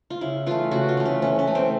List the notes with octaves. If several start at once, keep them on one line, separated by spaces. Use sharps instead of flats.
F4
C#3 E4
E3 A3 F4
C#3 F#4
F4
E3 A3
C#4
E3 C#4
C#4
A3
C4